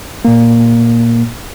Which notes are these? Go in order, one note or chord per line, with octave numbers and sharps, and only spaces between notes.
A#2 A#3